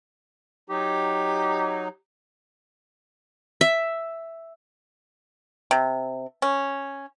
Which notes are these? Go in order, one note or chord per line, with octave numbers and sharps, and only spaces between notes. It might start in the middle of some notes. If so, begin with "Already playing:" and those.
F#3 D#4 G4
E5
C3
C#4